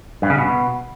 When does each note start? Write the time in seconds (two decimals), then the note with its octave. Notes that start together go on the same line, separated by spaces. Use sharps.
0.22 G2
0.30 C#3
0.38 B2